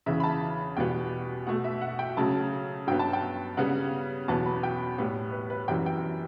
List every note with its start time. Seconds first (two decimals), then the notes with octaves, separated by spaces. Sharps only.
0.06 E2 C#3 E3 E5
0.20 B5
0.23 A5
0.77 E2 B2 G3 B3 G5
1.47 B2 A3 F#5
1.64 E5
1.81 F#5
1.99 G5
2.17 C#3 F#3 A3 A5
2.87 G2 F#3 B3 G5
2.99 A5
3.13 G5
3.57 C#3 G3 B3 F#5
4.28 E2 B2 F#3 B3 A5
4.46 B5
4.63 G5
4.98 A2 G3 B3
5.32 B4
5.50 B4
5.68 F#2 E3 G3 B3 G5
5.86 G5